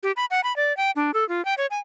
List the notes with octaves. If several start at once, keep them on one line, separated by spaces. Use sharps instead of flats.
G4
B5
F#5
B5
D5
G5
D4
A4
F4
G5
C#5
G#5